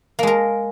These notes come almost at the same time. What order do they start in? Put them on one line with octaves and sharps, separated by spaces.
A#3 G#3 A#4